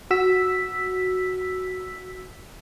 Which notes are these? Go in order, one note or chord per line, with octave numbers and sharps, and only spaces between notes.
F#4 E6 B6